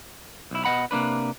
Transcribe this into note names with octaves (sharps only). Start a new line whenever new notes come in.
B1 E4
B2 G#3 D#5 F#5 B5
C3 A#3 D4 B4